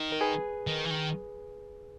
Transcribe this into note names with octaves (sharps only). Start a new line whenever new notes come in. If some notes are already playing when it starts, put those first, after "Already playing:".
Already playing: D#3
A#4
G#4 B4
D#3
E3
D#3